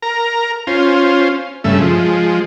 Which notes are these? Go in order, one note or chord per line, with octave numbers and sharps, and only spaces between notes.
A#4 A#5
C#4 F4 C5
G2 C#3 A3 E5
F3 G#3